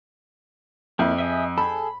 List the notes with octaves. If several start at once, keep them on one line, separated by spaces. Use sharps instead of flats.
F2 A#3 E4
G#4 D#5 E5
G#4 A4 B5